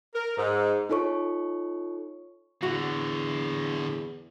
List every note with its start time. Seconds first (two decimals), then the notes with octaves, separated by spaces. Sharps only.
0.15 A#4
0.38 G#2
0.89 D#4 F4 A4 C#5 C#6
2.63 E2 A2 D3 F#4